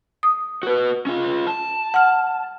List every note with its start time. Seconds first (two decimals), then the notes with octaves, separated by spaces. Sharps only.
0.23 D#6
0.63 F#4 B4
1.07 C#4 F4
1.47 A5
1.94 F#5 F6